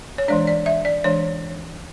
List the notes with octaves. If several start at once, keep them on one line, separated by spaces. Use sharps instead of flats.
C#5
E3 G#3 D4 D5
D5
E5
D5
E3 G#3 D4 C#5